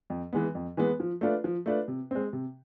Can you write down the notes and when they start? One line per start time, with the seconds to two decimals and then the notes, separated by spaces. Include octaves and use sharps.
0.10 F2
0.33 E3 G#3 B3
0.55 F2
0.77 E3 G#3 B3
1.00 F3
1.21 A3 D4 F4 B4
1.44 F3
1.66 A3 D4 F4 B4
1.88 C3
2.11 G#3 C4
2.33 C3